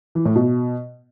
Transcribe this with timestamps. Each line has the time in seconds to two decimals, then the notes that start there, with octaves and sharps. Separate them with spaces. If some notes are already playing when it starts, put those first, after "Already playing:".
0.15 E3
0.25 A2
0.35 B2